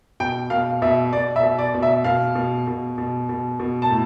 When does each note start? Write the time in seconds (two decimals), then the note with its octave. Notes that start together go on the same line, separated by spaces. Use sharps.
0.20 B2 G5
0.50 B2 F5
0.82 B2 E5
1.13 B2 D5
1.36 E5
1.43 B2
1.59 D5
1.74 B2
1.83 E5
2.04 B2 F5
2.35 B2
2.67 B2
2.98 B2
3.29 B2
3.60 B2
3.82 A5
3.90 A2